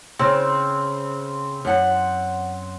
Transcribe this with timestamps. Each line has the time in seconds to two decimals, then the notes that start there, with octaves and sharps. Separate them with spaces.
0.19 C#3 C4
1.65 F#2 F#5